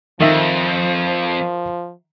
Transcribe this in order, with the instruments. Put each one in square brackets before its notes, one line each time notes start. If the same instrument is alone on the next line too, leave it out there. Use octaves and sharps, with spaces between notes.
[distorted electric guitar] F2 [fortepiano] D#3 E5 [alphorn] F3